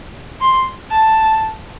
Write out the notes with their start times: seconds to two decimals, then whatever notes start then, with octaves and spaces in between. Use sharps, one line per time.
0.41 C6
0.90 A5